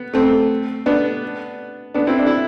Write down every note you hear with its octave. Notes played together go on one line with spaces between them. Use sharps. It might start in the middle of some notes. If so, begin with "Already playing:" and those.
Already playing: B3
A3 C4
B3 D4
B3 D4
C4 E4
D4
E4